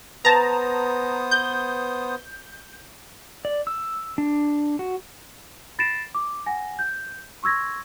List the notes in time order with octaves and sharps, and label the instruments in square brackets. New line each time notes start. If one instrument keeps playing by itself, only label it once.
[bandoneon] B3 C5 D#6 [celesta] B4 [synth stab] A5 A#5
[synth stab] G6
[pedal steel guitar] D5
E6
D4
F#4
[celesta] B5 A6 A#6 C7 D7 E7
D6
F#5 G#5 A#6
G6
C6 C#6 E6 G#6 A#6